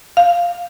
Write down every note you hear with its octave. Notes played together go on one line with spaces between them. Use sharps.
F5